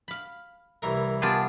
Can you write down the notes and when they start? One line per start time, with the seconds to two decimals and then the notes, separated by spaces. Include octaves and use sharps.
0.08 F5 B5
0.82 C2 E3 A#4
1.22 B3 F4 G4 G#4 A5